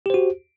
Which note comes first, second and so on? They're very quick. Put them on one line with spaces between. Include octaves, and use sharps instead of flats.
G4 C5 F#4